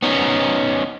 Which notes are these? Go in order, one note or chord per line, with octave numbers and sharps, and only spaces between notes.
B3 C#4 D#4